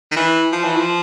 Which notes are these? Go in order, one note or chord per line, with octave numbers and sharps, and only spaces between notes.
D#3
E3
F3
E3
F3